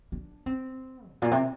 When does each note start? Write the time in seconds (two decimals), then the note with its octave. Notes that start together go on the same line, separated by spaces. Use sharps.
0.12 D4
0.46 C4
1.13 G#2
1.22 A#2
1.31 C3